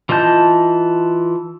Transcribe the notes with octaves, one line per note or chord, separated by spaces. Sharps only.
E3 F4 D#5 A5 G6